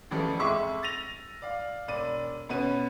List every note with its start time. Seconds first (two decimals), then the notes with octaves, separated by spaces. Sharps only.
0.11 C#2 E3 F3 G3 A3
0.39 F2 G#3 E5 C#6 D6 E6
0.83 A6 A#6 D#7 F7
1.42 D5 F5
1.88 E1 D5 D#7
2.49 B2 B3 C#4 D#7